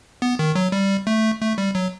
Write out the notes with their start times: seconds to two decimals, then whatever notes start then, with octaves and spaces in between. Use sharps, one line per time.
0.22 B3
0.39 D#3
0.55 F#3
0.72 G3
1.07 A3
1.41 A3
1.58 G3
1.75 F#3